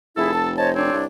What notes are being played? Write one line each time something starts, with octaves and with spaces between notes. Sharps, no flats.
F1 E4 G#4 A4 B5
A5
C5 C#5 D#5 A5
C4 D4 C#5
C2